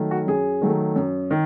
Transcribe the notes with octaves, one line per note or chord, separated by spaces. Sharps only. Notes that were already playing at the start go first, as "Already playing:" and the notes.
Already playing: D#3 F#3 A3
F#4
F#2 G#4
D#3 F#3 A3
F#2
D#3